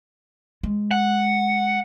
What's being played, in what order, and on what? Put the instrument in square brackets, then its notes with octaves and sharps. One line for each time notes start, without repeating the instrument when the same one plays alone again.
[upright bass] G#3
[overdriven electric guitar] F#5